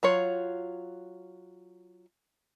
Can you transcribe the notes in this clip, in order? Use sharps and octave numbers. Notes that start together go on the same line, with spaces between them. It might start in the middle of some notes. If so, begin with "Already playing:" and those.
F#3 F4 C#5